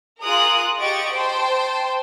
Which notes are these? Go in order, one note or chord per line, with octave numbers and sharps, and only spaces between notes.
F4 G#4 A#4 D#6 F#6
G4 D#5 C#6 A6 D7
C5 G5 A5 C6